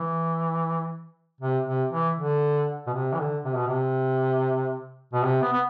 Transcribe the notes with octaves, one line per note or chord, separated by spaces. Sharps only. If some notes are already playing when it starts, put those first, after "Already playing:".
Already playing: E3
C3
C3
E3
D3
B2
C3
E3
D3
C3
B2
C3
B2
C3
B3
B3